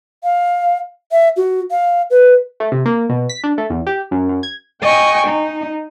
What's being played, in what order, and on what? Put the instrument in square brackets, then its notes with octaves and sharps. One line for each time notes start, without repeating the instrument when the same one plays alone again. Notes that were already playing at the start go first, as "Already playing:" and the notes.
[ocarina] F5
E5
F#4
F5
B4
[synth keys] A3
C3
A#3
B2
B6
D4
A3
E2
G4
F#2
F#2
G#6
[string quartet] D#5 G5 G#5 C#6
D#4